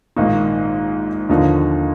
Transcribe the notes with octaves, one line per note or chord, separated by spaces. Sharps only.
A#1 G#2 D#3 A#3 D#4
D#2 D3 F3 A#3 D#4